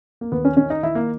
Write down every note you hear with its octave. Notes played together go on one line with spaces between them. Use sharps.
A#3
D#2 B3
C#4
D#3 C#4
D#4
D#3 E4
A#3